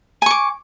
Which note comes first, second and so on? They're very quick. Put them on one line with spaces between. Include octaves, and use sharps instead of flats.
G#5 C#6 D6